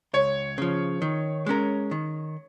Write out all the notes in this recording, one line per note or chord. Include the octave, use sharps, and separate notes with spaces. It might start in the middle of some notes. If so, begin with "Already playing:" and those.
C#2 C#5
C#3 F3
D#3
G#3 C#4 A#4
D#3